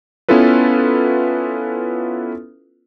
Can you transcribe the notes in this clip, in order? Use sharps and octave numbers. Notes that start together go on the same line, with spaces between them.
B3 C#4 E4 F4 A4 B4